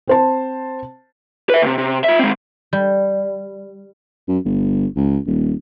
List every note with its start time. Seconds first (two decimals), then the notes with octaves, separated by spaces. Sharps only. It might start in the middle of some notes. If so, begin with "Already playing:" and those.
0.08 C4 C5 A5
1.50 B4 E5
1.62 D#2 C3
1.78 C3
2.04 F4 E5
2.19 G#3 C4
2.73 G3
4.28 F#2
4.45 G1
4.96 C#2
5.26 D#1